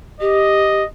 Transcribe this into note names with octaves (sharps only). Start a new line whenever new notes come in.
G4 D#5